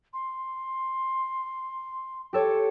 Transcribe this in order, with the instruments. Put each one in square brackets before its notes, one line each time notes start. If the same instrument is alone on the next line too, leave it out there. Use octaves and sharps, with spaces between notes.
[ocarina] C6
[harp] G4 A4 C#5 [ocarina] G5